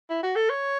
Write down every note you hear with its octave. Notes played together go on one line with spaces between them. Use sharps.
E4
F#4
A4
C#5